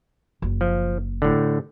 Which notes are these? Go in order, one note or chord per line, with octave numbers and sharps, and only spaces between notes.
F#1
F3
A2 D3